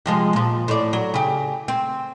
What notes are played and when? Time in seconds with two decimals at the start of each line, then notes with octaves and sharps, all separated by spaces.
0.06 C3 F3 G#3
0.33 A#2 F3
0.68 A2 D5
0.93 F#3
1.14 C#3 G4
1.68 C4